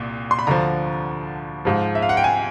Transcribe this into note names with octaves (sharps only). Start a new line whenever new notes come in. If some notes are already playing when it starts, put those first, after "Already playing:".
Already playing: C2 A#2
C6
B5
D2 D3 F3 A#5
G#2 F3
E5
F5
F#5
G5
G#5